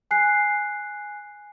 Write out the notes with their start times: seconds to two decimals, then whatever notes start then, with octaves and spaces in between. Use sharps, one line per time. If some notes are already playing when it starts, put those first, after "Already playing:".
0.11 G#5 F#6 C7